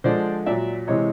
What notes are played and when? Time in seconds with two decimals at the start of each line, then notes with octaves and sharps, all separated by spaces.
0.04 D3 F3 G#3 C5 D5
0.46 A#2 F#3 D5 E5
0.87 C3 E3 G#3 C#5 D#5